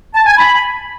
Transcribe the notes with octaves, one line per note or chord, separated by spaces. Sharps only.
A5
G#5
B5